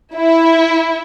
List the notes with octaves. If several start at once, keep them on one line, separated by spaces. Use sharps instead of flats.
E4